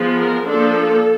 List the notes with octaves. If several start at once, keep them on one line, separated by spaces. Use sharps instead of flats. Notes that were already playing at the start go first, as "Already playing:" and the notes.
Already playing: F3 G#3 B3
A#4
F3 A#3 D4 A4